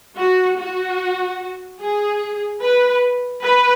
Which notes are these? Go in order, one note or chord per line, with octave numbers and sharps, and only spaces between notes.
F#4
F#4
G#4
B4
B4